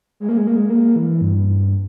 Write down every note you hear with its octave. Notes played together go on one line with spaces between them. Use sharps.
G#3
A#3
G#3
A#3
G#3
A#3
E3
G2